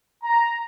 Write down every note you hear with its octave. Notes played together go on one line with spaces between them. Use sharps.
A#5